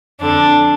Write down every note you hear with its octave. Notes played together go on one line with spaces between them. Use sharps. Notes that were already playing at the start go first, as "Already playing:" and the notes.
F2 D3 D4